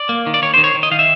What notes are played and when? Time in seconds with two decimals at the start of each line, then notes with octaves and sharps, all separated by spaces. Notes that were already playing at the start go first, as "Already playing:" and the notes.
Already playing: D5
0.09 A#3
0.27 D#3
0.34 D5
0.42 D#3 C#5
0.54 D#3 C5
0.64 C#5
0.75 D#3
0.83 D#5
0.91 D#3 F5
0.99 E5